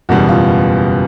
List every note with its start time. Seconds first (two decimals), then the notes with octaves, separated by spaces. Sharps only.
0.09 F#1 E2 B2 G3 F#4
0.29 F4